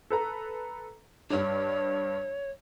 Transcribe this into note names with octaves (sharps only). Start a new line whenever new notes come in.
A4 B4 A#5
G2 D4 C#5